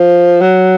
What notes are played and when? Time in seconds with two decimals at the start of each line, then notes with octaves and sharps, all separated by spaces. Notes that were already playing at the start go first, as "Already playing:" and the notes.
Already playing: F3
0.41 F#3